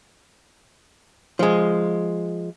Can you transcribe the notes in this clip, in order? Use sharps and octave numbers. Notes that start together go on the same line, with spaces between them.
F3 G#3